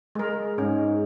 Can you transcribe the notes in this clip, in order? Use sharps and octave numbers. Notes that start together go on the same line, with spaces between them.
G#3 G#4 A#4
G#2 C#4